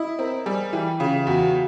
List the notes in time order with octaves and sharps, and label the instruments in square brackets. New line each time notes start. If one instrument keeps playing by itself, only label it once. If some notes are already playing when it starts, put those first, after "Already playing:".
Already playing: [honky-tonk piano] E4 [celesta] D#5 D#6
[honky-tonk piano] C4 [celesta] A#4 A#5
[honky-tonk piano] G3 [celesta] G#4 G#5
[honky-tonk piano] E3 [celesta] G4 G5
[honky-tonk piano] C#3 [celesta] F4 F5
[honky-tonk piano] E2 [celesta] F#4 F#5